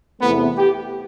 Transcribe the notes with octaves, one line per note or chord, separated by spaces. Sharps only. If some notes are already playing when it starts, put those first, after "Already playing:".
E2 C3 E3 A3 B3
G4